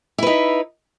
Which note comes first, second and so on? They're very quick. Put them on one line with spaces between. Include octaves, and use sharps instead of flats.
E4 B4 D#4